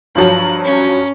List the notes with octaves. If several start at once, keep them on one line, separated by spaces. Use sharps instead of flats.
G2 F3 F#3 F#6
C#4